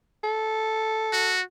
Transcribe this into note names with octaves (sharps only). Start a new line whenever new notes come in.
A4
F#4